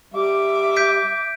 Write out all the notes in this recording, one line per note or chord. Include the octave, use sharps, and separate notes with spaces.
G3 E5 D6
G6 B6 D7